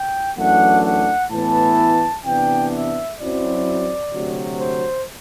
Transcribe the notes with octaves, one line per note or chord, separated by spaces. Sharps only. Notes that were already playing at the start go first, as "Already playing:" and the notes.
Already playing: G5
F#2 E3 A3 D4 F#5
F#5
A2 E3 B3 E4 A5
C3 E3 B3 D4 G5
E5
F#2 F#3 C4 E4 D5
D2 C3 F#3
C5